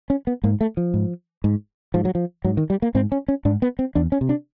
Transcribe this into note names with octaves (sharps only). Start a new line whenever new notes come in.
C#4
B3
G#2 A#3
A3
F3
G#2
G#2
G#2 F3
F#3
F3
G#2 F#3
D#3
G3
A#3
G#2 C4
C#4
C#4
G#2 D4
B3
C4
E2 D4
C#4
C3
D4